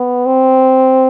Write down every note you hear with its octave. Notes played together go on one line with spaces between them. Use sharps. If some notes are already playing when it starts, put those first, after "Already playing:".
Already playing: B3
C4